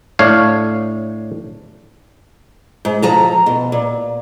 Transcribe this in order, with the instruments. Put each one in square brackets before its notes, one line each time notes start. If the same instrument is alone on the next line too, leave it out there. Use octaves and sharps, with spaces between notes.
[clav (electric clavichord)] A2 D4 C#5 F5
[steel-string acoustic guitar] G#2
F3 A4 A#5
B2
A#2